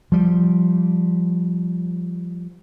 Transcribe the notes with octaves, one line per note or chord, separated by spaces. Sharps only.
F3 G3